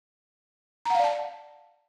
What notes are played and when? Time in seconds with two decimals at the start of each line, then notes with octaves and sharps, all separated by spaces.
0.85 A#5
0.90 F#5
0.95 F5
0.99 D5
1.04 A5